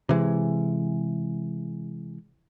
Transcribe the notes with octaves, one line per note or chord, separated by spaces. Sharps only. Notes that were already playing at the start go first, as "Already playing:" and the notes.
C3 E3 G#3